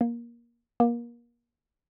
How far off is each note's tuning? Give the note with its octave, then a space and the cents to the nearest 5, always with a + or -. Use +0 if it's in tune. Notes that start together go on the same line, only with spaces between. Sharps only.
A#3 +20
A#3 +30